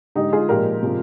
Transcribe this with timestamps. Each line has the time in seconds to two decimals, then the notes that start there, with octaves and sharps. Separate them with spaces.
0.15 D3 G#3 D#4 G4
0.32 F4 G#4
0.49 A#2 F3 G#3 G4 A#4
0.83 C3 F3 G#3